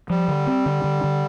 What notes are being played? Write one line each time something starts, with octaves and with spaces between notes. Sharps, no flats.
F3 G3
D3
C4
D3
D3
D3